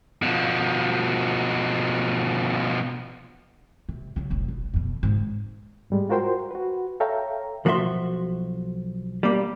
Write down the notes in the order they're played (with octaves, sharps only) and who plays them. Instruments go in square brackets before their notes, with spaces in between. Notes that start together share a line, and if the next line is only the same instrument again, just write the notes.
[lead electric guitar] B2 F3
[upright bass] C3
C#3 F#3
F1 B1
A#1
F2 B2
G#2 C#3
[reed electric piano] G#2 G3 G#3
F4 F#4 A#4 C5 G5 C6
F#4 B4
A4 C#5 E5 F5 G5 A#5
[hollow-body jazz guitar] B1 F3 F#4 A#4 E5 C6
G3 A#3